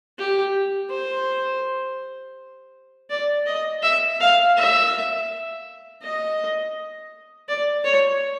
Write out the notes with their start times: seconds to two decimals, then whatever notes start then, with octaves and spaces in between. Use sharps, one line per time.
0.18 G4
0.90 C5
3.10 D5
3.46 D#5
3.83 E5
4.20 F5
4.56 E5
6.02 D#5
7.48 D5
7.84 C#5